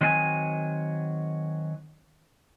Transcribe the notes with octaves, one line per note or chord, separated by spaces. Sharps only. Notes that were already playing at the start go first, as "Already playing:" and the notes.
D#3 F#3 C4 D#5 G#5